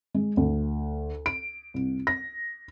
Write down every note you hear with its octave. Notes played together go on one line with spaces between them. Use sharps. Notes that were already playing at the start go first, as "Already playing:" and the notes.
G#3
D2
D7
C2
A#6